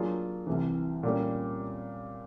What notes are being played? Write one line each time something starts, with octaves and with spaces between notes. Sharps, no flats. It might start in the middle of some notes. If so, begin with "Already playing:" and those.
Already playing: F#3 A#3 D4 F4 G#4
C2 C3 E3
A#2 G3 A#3 C#4